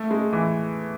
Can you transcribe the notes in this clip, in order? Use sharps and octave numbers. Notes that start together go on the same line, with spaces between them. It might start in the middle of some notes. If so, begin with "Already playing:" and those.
Already playing: A3
G#3
E3